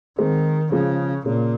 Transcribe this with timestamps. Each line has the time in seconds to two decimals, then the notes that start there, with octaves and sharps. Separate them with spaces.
0.18 D#3 G#3 C4
0.72 C#3 F3 G#3
1.26 A#2 C#3